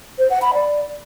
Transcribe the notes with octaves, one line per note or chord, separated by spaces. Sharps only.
C5
F#5
B5
D5